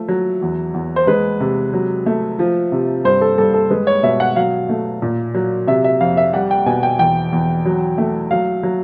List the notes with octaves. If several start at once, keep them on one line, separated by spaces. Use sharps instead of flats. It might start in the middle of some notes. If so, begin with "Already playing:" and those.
Already playing: F3 A3
F#3
E2
E2
C5
G#3 B4
C3
F#3
A3
F3
C3
G2 C5
A4
G2 A4
A4
G#3 B4
C#5
B2 E5
F#5
F#3 F5
A3
A#2
F#3
C3 E5
E5
F2 F5
E5
G3 F#5
G5
B2 G#5
G5
E2 G5
E2
F#3
A3
F#3 F5
F#3